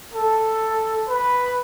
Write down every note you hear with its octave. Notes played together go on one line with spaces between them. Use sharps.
A4
B4